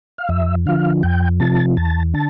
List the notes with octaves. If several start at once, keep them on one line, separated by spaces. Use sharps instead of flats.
F5
F2 E5
D3 F3 F5
F2 G5
C3 F3 A5
E2 A5
D3 A5